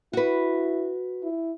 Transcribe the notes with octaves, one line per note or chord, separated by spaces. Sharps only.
E4 F#4 B4
E4